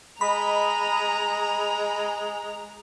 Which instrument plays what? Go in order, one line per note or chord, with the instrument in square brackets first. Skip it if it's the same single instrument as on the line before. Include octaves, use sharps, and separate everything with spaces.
[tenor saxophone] G#3 [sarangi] D#5 [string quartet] A#5 [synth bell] B5